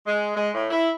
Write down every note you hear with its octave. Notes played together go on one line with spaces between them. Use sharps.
G#3
G#3
A2
E4